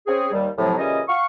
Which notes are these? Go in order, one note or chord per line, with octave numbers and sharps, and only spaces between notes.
C4 C#4 G#4
D#2 G3
A2 C3 F3 F#3
A#2 C#3 E3 G3 C#4 D#5
F5 F#5 C#6